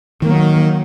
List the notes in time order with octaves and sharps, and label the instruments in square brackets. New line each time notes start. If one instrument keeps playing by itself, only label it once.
[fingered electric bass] D#3 [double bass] F#3 A#3